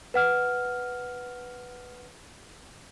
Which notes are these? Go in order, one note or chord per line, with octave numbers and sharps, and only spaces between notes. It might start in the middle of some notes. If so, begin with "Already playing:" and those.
B4 F#5 F6